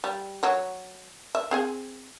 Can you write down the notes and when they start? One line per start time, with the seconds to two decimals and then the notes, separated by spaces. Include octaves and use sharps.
0.04 G3
0.43 F#3 C#5
1.35 E5
1.51 C4 G#4 G#5